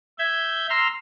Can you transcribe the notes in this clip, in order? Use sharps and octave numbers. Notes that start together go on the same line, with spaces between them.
E5 G6 G#6
A#5 C6 E6 F6